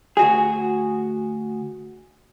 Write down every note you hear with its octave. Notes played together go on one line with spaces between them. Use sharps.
D2 F#4 G#4